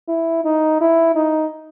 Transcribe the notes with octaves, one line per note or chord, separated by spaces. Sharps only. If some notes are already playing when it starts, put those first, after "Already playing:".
E4
D#4
E4
D#4